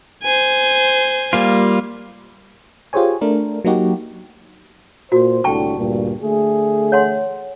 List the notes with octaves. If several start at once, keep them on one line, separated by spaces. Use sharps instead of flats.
C5 G#5
G3 A#3 F4
F4 G4 G#4 C5 C#5 G#5
A3 D4 A#4
F#3 A#3 D#4 F#4 G4
A#2 F#4 C5
C2 A2 D3 G5 A5 C#6
D2 G2 A#2
D3 A3 G#4
C#5 F#5 C6